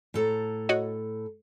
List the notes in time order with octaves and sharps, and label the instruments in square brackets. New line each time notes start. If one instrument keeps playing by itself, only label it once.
[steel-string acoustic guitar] A2 A4 A#5
[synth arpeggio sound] F#4 C#5 D#5